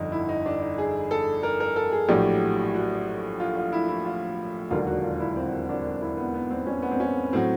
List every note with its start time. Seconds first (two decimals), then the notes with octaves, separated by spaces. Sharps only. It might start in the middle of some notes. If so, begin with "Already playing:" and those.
Already playing: G1 F2 D3 D#4
0.12 E4
0.29 D#4
0.46 D4
0.62 D#4
0.78 G#4
1.11 A4
1.43 A#4
1.60 A#4
1.76 A4
1.92 G#4
2.08 A#1 A2 F#3 G4
2.74 F#4
3.40 F4
3.56 F4
3.73 E4
3.88 E4
4.05 F4
4.70 E1 D#2 D3 F#3 F4
4.87 F#4
5.03 F4
5.20 E4
5.36 C4
5.69 D4
6.01 E4
6.17 B3
6.34 B3
6.51 C4
6.67 C#4
6.82 B3
6.91 C4
7.00 C#4
7.33 A2 F#3 C4